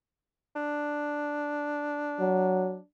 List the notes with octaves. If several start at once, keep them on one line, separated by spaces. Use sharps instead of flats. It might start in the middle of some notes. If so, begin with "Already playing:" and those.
D4
F#3